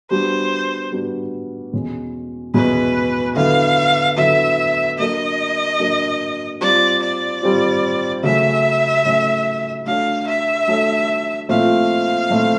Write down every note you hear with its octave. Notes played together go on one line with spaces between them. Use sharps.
G3 B3 D4 F#4 C5
G3 B3 D4 F#4
E2 B2 G#3 C#4
E2 B2 G#3 C#4 B4
D3 F#3 B3 E4 F5
D3 F#3 B3 E4 E5
F#3 A#3 D4 F#4 A#4 D#5
F#3 A#3 D4 F#4 A#4
G3 C4 F4 D5
D5
G3 C4 F4
C#3 F#3 A3 C#4 E5
C#3 F#3 A3 C#4
A3 D4 F#4 A4 C#5 F5
E5
A3 D4 F#4 A4 C#5
A#2 F3 A3 C4 E4 F5
A#2 F3 A3 C4 E4